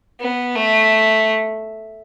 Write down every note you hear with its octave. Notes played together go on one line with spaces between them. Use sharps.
B3
A3